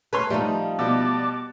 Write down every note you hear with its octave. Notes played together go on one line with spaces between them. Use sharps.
A3 C#4 B4 C#5 C6
F3 G3 A3 D#4
B2 G3 D5 A5